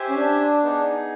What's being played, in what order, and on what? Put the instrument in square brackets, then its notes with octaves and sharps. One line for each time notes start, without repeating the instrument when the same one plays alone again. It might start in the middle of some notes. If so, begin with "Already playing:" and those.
Already playing: [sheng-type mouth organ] G4 C5 E5 G#5
[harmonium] C#4
D4
[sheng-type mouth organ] B3 D#4 G#4